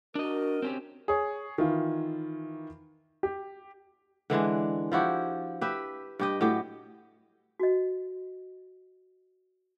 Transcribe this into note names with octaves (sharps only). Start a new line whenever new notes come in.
D4 F#4 A#4 D#5
C4 C#4 G4
G#4 C#5
D#3 E3 F4
G4
D3 E3 G#3 D4
F3 E4 F#4 G4
G4 B4 E5
G2 G4 D#5
A2 F#3 G4
F#4 D#5